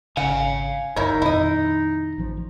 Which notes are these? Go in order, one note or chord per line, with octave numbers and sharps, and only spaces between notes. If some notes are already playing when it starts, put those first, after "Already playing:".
G#1 C#3 F5 F#5 G#5
G1 D2 G2 D#4 E4 A#4 C#5
F2 A#2 D#3 E4 D#5
A1 E3 F3